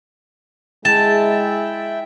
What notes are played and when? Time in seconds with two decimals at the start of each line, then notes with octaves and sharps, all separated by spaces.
0.85 G#3 E4 E5 G5 A5